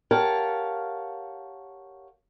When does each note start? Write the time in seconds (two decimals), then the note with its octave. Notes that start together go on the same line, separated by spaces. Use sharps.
0.11 G4 A#4 C#5 F5 F#5 A5